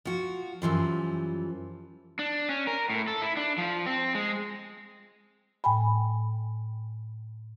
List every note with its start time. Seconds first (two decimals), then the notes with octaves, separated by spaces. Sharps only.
0.05 F3 F#4
0.62 F#2 E3 F3 G3
2.19 D4
2.49 C#4
2.67 A#4
2.90 A2
3.08 A4
3.22 E4
3.37 D4
3.58 F3
3.86 C4
4.15 G#3
5.64 A2 G5 G#5 B5